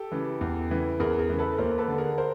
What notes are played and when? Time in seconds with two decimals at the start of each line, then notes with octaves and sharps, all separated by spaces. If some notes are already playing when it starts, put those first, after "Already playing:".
Already playing: G4 A4
0.11 C#3 E3
0.41 E2
0.70 C#3 E3
1.00 E2 G#4 A#4
1.19 G#4 A#4
1.30 C#3 E3
1.39 A4 B4
1.58 D#2 A#4 C5
1.78 A4 B4
1.88 D3
1.98 G#4 A#4
2.18 A#4 C5